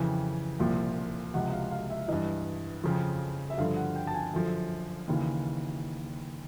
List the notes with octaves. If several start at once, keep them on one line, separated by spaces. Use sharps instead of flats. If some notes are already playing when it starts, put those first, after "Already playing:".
Already playing: F2 C#3 E3 G5
C2 A#2 F3
C#2 C3 F3 F#5
F#5
F5
F5
E5
G2 E3 D#5
F2 C#3 F3
E5
G2 D3 F3 F5
F#5
G5
A5
G#5
F#2 D3 F3
D#2 C#3 E3